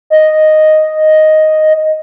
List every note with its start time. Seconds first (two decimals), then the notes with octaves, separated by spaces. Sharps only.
0.10 D#5